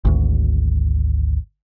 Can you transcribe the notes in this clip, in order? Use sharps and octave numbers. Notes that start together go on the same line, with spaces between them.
G#1 D2